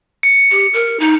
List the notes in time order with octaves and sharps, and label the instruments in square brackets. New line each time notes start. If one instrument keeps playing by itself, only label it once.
[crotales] C#7
[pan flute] G4
A#4
D#4